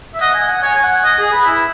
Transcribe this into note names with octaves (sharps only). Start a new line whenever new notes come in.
E5
D#5 F#5
G#5
F#5
C#5 G#5
G#5
F#5
D#5
G#4
B4
E4